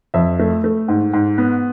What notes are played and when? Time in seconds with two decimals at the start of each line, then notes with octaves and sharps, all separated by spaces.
0.14 F2 E5
0.39 A3
0.64 A3
0.88 G#2
1.13 G#2
1.38 B3